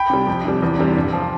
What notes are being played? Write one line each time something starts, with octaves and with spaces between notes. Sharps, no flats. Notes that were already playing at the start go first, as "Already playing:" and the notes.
Already playing: G5 B5
C3 G3
F2
C3 G3
E2
C3 G3
G2
F3